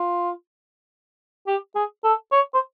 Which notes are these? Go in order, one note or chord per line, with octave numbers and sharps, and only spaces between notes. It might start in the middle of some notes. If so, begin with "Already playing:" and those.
Already playing: F4
G4
G#4
A4
C#5
C5